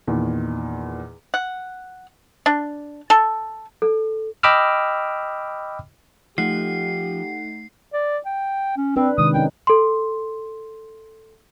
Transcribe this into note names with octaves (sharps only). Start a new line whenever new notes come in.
E2 A#2 D#3
F#5
D4
A4
A4
D#5 G5 B5 D6 E6 F6
F3 A3 D#4 G4 F#5 C7
D5
G5
C#4
C4 D4 B4
C3 D#3 G#3 D#6
C#4 D#4 G5
A4 C6